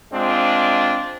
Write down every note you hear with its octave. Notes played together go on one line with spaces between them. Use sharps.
G#3 C4 D4 F4